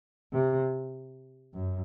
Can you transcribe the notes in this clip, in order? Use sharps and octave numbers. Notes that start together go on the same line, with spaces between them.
C3
F#2